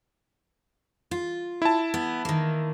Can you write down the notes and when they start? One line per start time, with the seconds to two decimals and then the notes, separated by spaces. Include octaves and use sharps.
1.11 F4
1.62 E4 A5
1.94 B3
2.25 D#3 A#3